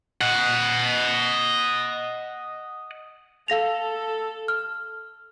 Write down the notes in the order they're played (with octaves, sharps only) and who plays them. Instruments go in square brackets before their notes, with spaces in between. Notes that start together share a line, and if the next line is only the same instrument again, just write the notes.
[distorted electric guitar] D#5 F#5
[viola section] A4 [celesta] F5 A#6 F7
[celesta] F6